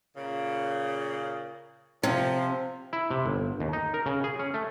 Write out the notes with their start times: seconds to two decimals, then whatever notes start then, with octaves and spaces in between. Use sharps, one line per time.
0.16 A#2 C#3
2.03 C3 F3
2.93 E4
3.11 C3
3.26 G1
3.60 D#2
3.73 D#4
3.94 A#4
4.06 C#3
4.24 G#4
4.39 C#4
4.54 A3